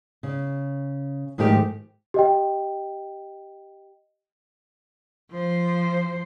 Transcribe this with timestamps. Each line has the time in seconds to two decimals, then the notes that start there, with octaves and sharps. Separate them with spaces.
0.23 C#3
1.38 G#2 D#3 F3 A3 G4
2.14 G4 D#5 G5
5.31 F3 C5